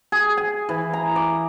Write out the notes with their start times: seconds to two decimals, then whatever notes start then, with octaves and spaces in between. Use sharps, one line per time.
0.12 G#4
0.37 G#5
0.69 E3
0.93 A#5
1.16 D6